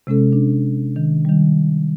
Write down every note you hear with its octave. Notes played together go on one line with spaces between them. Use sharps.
C3 G#3 C#4 A4
D4
D#3
D#3 G3